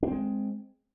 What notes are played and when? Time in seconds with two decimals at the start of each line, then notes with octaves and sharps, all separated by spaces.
0.03 D4
0.07 C4
0.11 G#3